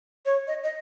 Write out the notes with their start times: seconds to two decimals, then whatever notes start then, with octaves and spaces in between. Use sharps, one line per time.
0.26 C#5
0.47 D#5
0.64 D#5